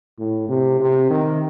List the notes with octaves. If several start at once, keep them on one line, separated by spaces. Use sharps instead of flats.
A2
C3
C3
D#3